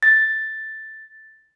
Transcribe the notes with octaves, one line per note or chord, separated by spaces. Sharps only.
A6